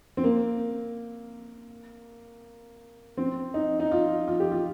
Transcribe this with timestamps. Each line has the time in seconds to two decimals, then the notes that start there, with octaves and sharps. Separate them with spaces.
0.17 C4
0.24 A#3
3.17 C4
3.54 D#4
3.80 D#4
3.91 F4
4.28 F4
4.40 G4
4.51 F4